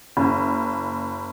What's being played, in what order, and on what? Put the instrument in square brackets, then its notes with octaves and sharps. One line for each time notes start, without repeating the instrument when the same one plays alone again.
[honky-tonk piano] F#1